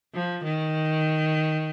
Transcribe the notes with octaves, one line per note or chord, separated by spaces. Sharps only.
F3
D#3